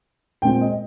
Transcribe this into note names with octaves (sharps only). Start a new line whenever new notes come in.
A#2 G#3 C4 G5
D#5